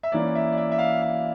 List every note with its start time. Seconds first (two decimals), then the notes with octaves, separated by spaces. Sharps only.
0.03 E5
0.12 E3 A#3 C#4 D5
0.35 E5
0.52 D5
0.58 E5
0.72 E5
0.79 F5
1.02 F5